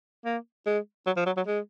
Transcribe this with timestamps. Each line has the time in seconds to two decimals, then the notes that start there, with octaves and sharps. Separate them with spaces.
0.25 A#3
0.66 G#3
1.06 F#3
1.16 F3
1.26 F#3
1.37 F#3
1.47 G#3